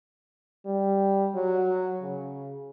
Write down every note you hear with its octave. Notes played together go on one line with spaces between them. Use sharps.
G3
F#3
C#3